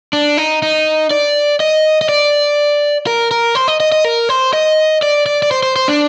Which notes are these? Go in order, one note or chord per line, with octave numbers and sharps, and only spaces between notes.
D4
D#4
D#4
D5
D#5
D#5
D5
A#4
A#4
C5
D#5
D#5
D#5
A#4
C5
D#5
D5
D5
D5
C5
C5
C5
D4